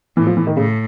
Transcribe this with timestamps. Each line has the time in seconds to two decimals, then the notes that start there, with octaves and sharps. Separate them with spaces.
0.17 A2 E3
0.27 F3
0.37 E3
0.47 D#3
0.57 A2 C#3